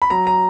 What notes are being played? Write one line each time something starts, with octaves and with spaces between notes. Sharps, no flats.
B5
F#3 A#5
A#5